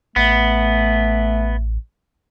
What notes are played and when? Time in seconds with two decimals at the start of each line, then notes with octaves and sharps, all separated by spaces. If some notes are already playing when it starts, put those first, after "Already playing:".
0.16 A1 A3 B3